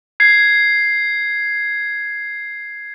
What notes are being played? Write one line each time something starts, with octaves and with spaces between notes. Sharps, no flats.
G#6 C7